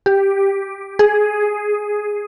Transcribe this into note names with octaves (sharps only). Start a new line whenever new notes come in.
G4
G#4